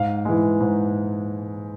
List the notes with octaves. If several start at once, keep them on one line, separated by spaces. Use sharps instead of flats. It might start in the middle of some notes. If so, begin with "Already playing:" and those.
Already playing: G#2 F5
E3 G#3
G#2